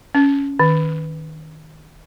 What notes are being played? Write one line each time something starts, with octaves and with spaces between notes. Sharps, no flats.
C#4
D#3